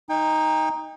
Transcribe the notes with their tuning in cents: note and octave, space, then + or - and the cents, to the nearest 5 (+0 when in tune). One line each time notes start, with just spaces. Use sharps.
D#4 +0 G5 +30